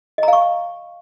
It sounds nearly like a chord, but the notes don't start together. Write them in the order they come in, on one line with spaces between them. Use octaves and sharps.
D#5 A#5 F5 C#6